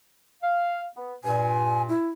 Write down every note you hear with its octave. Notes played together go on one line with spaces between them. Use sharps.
F5
B3
G2 A#2 G#5
E4